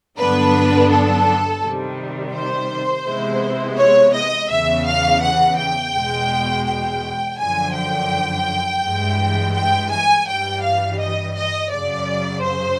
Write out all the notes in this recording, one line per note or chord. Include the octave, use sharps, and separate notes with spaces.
G2 D3 F#3 B3 D4 B4
A4
C3 D#3 G3
C5
C3 E3 G#3 B3 E4
C#5
D#5
E2 C#3 E3 E5
F5
F#5
G5
E2 B2 G#3
G5
F#2 D3 F3 G#5
G5
G2 E3 G#3
G5
G#5
G2 E3 G3 G5
F5
D#5
D#5
F#2 C#3 F#3 D5
C5